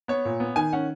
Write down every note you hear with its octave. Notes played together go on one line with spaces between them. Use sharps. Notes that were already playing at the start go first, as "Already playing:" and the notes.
B3 C#5
A#2
B3
D#3 G#5
C#4 F#5